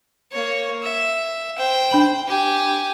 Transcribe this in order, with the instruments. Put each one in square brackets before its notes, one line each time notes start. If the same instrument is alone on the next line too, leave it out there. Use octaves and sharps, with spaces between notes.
[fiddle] A#3 C#5
E5
C5 G5
[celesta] D4 B5 F#7
[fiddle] G4 G#5